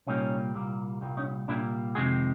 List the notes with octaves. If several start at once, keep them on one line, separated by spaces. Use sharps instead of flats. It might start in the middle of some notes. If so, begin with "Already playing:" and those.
C2 A#2 G3 A#3 C#4 D#4
C2 A#2 G3 A#3
C2 A#2 G3 A#3
C#4 D#4
C2 A#2 G3 A#3 D4 E4
F2 C3 D#3 G#3 F#4 G#4